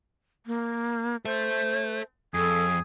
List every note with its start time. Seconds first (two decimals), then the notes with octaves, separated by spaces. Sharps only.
0.46 A#3
1.25 A4 C5 E5
2.34 F2 G#4 A4